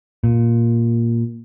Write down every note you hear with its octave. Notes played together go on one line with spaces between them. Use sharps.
A#2